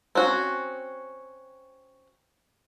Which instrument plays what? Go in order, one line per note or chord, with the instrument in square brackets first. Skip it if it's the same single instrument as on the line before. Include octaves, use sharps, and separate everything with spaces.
[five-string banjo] C4 C#4 F#4